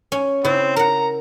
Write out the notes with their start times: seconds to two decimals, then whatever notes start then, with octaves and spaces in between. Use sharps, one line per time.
0.12 C#4
0.45 C#3 C4 E4
0.76 A#4 F#5 A#5